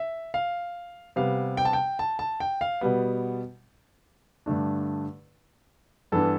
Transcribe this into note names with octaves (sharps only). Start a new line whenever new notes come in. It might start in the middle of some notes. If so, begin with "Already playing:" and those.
Already playing: E5
F5
C3 G3 B3 F5
G5
A5
G5
A5
A5
G5
F5
B2 G3 B3
G2 D3 A3 D4
G2 E3 B3 D4 A4